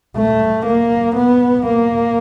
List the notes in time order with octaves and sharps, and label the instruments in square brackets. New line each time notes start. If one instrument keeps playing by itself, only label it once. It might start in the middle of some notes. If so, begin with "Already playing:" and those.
[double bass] A3
A#3
B3
A#3